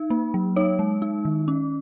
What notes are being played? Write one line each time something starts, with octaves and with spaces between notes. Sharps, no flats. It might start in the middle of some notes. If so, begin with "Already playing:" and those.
Already playing: D#4
A#3
F#3
D#4 C#5
G#3
D#4
D#3
C#4